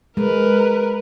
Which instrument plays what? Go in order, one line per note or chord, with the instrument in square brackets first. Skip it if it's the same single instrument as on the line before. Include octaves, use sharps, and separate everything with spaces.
[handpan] G#3 [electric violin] A#4 B4